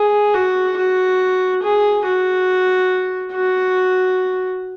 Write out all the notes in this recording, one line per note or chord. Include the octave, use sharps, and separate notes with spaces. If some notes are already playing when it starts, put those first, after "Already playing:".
Already playing: G#4
F#4
F#4
G#4
F#4
F#4